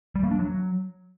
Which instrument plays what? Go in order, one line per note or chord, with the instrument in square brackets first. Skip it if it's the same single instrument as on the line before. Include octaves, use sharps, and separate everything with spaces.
[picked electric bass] G3
A#3
D4
F#3